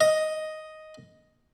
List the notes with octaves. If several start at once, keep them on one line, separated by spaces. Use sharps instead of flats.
D#5